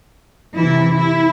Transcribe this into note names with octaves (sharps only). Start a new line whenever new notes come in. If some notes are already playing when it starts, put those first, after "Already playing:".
C3 E3 E4
E4